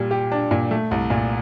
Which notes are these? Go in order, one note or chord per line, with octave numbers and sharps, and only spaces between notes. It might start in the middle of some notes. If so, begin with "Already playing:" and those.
Already playing: A#2 G3
G4
D4
A#2
A3
C2
A#2